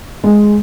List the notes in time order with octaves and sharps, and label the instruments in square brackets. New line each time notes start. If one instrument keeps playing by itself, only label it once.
[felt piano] G#3